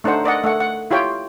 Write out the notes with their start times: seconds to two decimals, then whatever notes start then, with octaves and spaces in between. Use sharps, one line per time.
0.04 A3 D4 D#4 C5 F#5
0.24 A#4 D5 D#5 F#5
0.44 A3 F#5
0.60 F#5
0.91 E4 F4 G4 C#5 G5